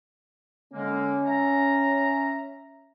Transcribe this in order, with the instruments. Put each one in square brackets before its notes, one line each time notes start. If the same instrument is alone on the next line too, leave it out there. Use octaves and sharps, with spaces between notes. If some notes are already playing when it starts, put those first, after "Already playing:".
[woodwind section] D3 G#3 A#3 [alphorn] C#4
[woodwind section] E5 A#5